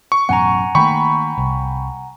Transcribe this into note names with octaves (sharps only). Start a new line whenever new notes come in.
C#6
A1 F#2 B2 F#5 G#5 A#5
D#3 A3 A#3 G5 B5 C#6
C2